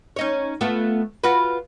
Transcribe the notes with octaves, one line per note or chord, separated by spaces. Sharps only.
C#4 D#4 C#5
A3 B3 F4
F4 F#4 B4